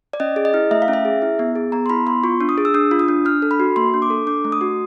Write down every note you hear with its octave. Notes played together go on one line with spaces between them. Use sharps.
D5
C#4 D#5
G#4
D#5
E4
A3 E5
F5
C#4
E5
G#4
E4
B3
G#4
B3 A#5
C6
E4 B5
B3 C6
F4 C#6
D4
D#6
G#4
E6
D4 D#6
F4
D#6
D4
D4 F6
A4
B5
F#4
A#3 C6
D4
D6
A4
D4 D6
A3
D#6
F#4